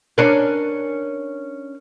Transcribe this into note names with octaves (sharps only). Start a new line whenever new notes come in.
C#4 D4 A#4